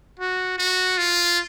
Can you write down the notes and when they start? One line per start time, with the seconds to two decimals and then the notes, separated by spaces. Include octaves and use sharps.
0.19 F#4
0.59 F#4
0.98 F4